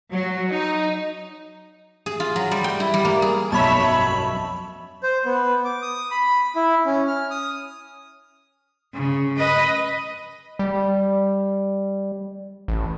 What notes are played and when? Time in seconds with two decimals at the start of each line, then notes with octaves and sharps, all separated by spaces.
0.11 F#3
0.51 D#4
2.06 G#4
2.20 F4
2.36 F#3
2.51 G3
2.64 G5
2.80 E4
2.94 G3
3.05 A#3
3.22 G#4
3.52 B1 F2 F#3 C#5 E5 A5 B5
5.03 C5
5.25 B3
5.65 D6
5.82 D#6
6.11 B5
6.56 E4
6.85 C#4
7.07 F6
7.31 D#6
8.94 C#3
9.37 B4 D#5
10.59 G3
12.68 A1